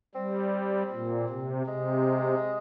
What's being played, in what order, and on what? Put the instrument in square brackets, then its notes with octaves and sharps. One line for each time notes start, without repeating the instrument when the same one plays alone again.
[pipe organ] G3 [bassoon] C4
[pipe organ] A#2
C3
[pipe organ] C3 [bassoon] G#3